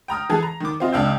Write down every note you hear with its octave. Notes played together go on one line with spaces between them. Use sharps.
G5 A#5 D#6 F6
E3 G#4 A4
A#5
D#3 D6
C4 F4 D#5
C#2 D4 F5 G5 E6 G6